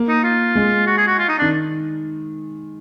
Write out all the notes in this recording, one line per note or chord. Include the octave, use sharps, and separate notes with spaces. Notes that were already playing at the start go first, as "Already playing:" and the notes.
Already playing: A#3
D#4
F4
G#3
F#4
G#4
F#4
F4
D#4
D#3 D4